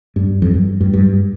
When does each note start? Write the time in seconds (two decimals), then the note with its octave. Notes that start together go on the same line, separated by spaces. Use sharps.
0.16 G2
0.42 F2
0.55 G2
0.80 G2
0.93 G2